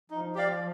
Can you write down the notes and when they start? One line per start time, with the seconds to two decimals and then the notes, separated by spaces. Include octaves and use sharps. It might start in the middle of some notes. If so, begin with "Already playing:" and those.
0.10 F3 D#4
0.35 G4 D5 F5